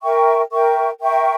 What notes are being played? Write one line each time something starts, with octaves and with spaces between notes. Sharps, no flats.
A#4 E5 G5 C#6
A#4 E5 G5 C#6
A#4 E5 G5 C#6